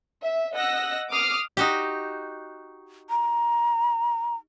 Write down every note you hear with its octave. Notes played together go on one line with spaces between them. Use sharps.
E5
D#5 F#5 E6 F#6 A#6
D6 D#6 F6 C7
D#4 F#4 G4
A#5